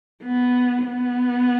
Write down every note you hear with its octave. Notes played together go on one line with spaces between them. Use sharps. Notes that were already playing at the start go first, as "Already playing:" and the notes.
B3
B3